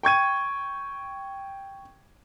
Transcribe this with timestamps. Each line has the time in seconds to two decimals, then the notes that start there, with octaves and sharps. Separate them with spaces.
0.03 G5 C#6 G#6 D#7